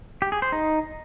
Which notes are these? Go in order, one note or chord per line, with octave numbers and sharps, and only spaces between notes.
G4
G#4
C5
D#4